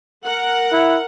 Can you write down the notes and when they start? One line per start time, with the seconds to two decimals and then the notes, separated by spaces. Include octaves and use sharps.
0.25 A#4 F#5
0.72 E4